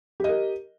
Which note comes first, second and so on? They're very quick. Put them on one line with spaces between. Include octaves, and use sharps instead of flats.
G4 D#5 A#4